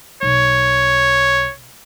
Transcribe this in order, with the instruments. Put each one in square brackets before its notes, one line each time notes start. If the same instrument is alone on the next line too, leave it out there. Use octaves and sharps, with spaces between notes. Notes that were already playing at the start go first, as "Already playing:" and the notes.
[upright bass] B1 [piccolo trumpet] C#5